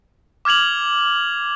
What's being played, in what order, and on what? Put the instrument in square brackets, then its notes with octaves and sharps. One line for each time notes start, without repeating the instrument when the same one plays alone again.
[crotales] D6 F6 G#6 F7 F#7